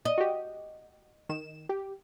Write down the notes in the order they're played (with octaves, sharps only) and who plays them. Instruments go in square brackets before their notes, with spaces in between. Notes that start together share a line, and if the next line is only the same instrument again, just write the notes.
[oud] D#5
[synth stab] F#4 G4
D#3 E7
G4